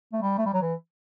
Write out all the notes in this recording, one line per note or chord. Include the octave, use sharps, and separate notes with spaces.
A3
G3
A3
G3
F#3
E3